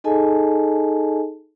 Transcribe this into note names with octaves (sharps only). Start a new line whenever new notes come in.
D#4 G#4 A4 D#5 G#5 A5